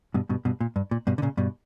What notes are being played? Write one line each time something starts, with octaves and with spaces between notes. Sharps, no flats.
G2 B2
G2 B2
G2 B2
A#2
G2
A#2
G2 B2
D3
A#2 C#3
G2 B2